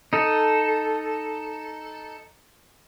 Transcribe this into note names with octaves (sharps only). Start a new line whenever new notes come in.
D#4 A4